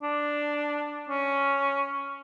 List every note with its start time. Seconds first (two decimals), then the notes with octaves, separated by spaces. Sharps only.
0.03 D4
1.09 C#4